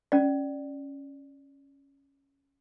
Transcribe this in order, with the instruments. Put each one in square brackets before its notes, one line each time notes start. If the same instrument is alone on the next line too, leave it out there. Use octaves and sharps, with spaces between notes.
[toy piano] C#4 D5